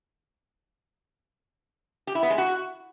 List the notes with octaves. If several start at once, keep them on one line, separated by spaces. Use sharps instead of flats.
G4
E4
B3
G#3
F#4